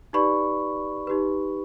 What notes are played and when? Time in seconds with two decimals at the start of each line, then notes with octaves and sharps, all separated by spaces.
0.13 D#4 G4 B4 D5 B5 C#6
1.07 D#4 G4 B4